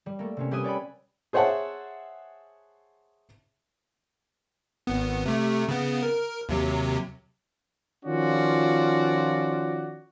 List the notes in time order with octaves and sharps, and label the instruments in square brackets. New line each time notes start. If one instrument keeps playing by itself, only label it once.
[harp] G3
A3 A#3
C3 C4 C#4
G3 G4 B4 E5 G#5 D#6
C#5 D5 G5 B5
[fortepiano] G#4 C5 C#5 E5 F#5 A5
[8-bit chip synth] G#1 B3
C3 A3
C#3 B3
A#4
D#2 C3 F#3
[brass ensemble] D#3 F3 C#4 F4 F#4 D5